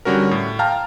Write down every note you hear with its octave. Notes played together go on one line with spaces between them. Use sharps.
D3 G3 C#4 F#4 A#4
A2
F5 G5 A5 A#5 F6